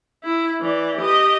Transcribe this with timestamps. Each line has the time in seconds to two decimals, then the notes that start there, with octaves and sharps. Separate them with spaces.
0.24 E4
0.61 E3 D5
0.97 G4 D#5